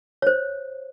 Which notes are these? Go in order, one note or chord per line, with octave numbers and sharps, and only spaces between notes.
C5 C#5